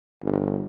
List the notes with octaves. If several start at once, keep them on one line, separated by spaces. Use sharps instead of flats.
G1